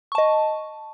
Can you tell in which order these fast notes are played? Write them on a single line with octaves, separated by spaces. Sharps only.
C#6 A5 D#5